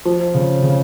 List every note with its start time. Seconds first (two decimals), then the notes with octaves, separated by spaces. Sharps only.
0.05 F3
0.35 C#3
0.63 C#3